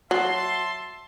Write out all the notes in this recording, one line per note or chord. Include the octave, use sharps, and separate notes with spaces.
F#3 E5 A5 C6